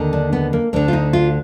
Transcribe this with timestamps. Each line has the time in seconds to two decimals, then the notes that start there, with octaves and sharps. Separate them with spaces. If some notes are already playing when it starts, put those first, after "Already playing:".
Already playing: D#2 D3
0.13 D4
0.33 B3
0.53 A#3
0.73 D2 D3 D4
0.88 F4
0.93 D#4
1.13 F4